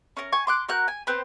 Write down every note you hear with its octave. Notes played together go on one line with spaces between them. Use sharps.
C#4 A#4
G#5 C#6
C6 D6 F#6
F#4 A#4 F#6 G6
G#5
B3 C4 C5